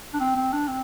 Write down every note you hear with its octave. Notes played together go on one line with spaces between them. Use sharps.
D4
C4
C4
D4
C4